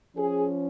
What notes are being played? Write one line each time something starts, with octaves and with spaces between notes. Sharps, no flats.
F3 C#4 G#4